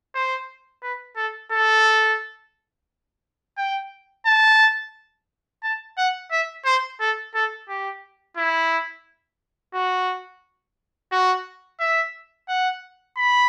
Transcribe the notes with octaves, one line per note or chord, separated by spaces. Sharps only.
C5
B4
A4
A4
G5
A5
A5
F#5
E5
C5
A4
A4
G4
E4
F#4
F#4
E5
F#5
B5